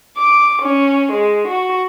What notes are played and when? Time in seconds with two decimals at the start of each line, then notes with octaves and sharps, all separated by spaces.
0.18 D6
0.62 C#4
1.12 G#3
1.49 F#4